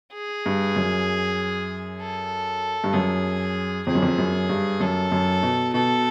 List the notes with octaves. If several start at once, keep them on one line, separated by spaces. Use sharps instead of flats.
G#4
G2
F#2
A4
G2
F#2 G#4
F2 G#4
F#2
F2
F#2
G2
F#2 A4
F#2
B2
B2 A4